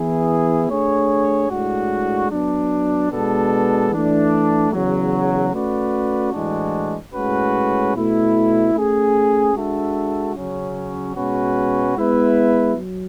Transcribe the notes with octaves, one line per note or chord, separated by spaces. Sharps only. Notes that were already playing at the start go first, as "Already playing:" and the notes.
Already playing: E3 B3 E4 G#4
A3 D4 G#4 C#5
A2 G#3 D4 F#4
F#3 B3 D4
B2 G#3 B3 D4 A4
E3 A3 D4
E2 C#3 F#3
A3 C#4 F#4 B4 D5
A2 E3 G#3 D4 F#4
A2 G#3 C#4 F#4 B4
B2 A3 E4
A3 C#4 G#4
G#3 D4 F#4 A4 E5
C#3 F#3 C#4
B2 G#3 C#4 F#4 B4
G#3 B3 E4 B4 E5
F#3